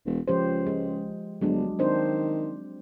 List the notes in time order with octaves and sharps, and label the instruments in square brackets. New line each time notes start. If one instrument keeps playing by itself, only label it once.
[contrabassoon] E1
[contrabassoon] C#2 [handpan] F3 G4 C5
[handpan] G#3
[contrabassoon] G1 [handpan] F#3 G#3 D4
[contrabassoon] D#3 [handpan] C4 D4 C5